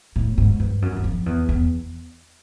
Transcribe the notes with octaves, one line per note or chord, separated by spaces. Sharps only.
A2
G#2
G2
F#2
E2
F2
E2
E2